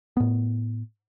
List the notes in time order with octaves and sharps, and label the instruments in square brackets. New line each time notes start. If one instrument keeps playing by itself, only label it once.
[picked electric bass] A2 B3